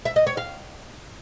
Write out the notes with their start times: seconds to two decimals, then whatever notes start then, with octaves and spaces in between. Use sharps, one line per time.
0.05 E5
0.16 D#5
0.27 C#5
0.37 F5